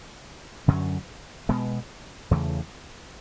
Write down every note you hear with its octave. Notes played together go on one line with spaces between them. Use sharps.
F#2 D3 F#3 C#4
B2 G#3 B3
E2 C#3 E3 A3